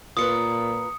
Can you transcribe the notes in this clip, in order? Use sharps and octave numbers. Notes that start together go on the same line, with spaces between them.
A#2 F4 A#4 B4 D#6 C#7